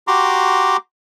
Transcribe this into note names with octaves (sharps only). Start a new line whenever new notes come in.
F#4 G4 A#5 C6 D6